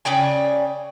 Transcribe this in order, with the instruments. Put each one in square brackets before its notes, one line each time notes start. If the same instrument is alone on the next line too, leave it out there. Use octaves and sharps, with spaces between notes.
[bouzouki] C#3 D5 G5 G#5